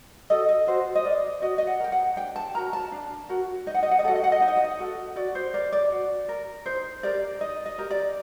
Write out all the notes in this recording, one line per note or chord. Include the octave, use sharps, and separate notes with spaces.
F#4 A4 D#5
D#5
F#4 C5
D#5
A#4 D5
F#4 D#5
D#5
F#5
A#4 G5
F#5
D4 G5
A5
F#4 A#4 A#5
A5
D4
F#4 A#4
D#4 D#5
F#5
D#5
F#5
D#5
F#4 A4 F#5
D#5
F#5
D#5
D#4 F#5
D#5
F#5
D#5
F#4 A4
F#4 D5
C5
A#4 D5
D5
F#4
A#4
D#4 C5
G4 A#4 D5
D#4 D#5
D#5
G4 A#4
D5